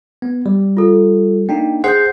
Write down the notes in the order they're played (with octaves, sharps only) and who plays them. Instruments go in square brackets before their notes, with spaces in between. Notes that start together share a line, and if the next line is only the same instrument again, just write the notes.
[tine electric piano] B3
G3
[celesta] F4 A4
[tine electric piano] A#3 D4 D#4 [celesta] G5
[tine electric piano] G#4 C5 F#5 [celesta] G6 C7